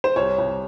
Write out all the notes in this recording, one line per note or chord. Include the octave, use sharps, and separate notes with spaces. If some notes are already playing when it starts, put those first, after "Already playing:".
C5
C2 C#5
C2